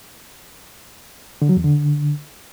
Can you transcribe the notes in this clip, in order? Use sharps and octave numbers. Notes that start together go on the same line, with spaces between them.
D3
F#3
E2
D3